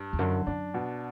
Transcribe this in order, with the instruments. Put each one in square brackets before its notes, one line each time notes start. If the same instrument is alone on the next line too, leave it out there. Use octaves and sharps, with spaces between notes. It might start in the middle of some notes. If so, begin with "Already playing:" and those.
Already playing: [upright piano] G2
[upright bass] E2
[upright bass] F#2 [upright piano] D3
[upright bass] F#2 [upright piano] D4
[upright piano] B2